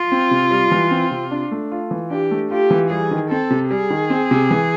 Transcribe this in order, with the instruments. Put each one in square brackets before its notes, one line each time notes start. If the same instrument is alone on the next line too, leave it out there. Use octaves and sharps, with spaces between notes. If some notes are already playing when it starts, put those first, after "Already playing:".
Already playing: [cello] F4
[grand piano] C4
C3
G3
E3
C4
C3
D4
A3
F4
E3
[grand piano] D4 [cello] G4
[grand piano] A3
[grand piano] F4 [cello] G4
[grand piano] E3
[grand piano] G3 [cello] G#4
[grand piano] D#3
[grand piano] C4 [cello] A4
[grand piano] C3
[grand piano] G3 [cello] G#4
[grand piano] D#3
C4
C3
E3